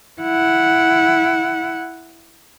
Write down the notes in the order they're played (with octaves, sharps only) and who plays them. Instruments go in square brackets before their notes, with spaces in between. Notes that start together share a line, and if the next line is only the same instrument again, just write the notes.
[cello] E4 F#5